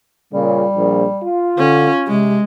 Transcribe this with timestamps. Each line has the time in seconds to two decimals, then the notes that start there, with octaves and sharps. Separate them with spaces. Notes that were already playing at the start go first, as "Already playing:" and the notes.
0.33 A#2 C#3 G3
0.76 A#1
1.23 F4
1.58 D3 C#4
2.07 C3 G#3